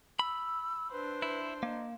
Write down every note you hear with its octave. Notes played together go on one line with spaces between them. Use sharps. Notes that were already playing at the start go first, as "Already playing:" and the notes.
B5 E6
D4 B4 C5
E4
A#3 D#5